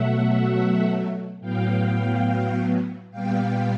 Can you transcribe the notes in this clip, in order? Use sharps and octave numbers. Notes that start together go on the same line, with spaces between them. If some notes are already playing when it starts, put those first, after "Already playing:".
Already playing: B2 F#3 A3 E5 F#5
A2 F#3 B3 F5 G5
A#2 G3 B3 F5 G5